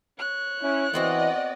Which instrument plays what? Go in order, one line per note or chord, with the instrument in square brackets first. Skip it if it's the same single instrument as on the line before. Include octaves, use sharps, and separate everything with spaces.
[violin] C#5 F#6
[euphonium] C#4 [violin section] E4
[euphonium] E3 [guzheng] B3 C4 F#4 [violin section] D5 D#5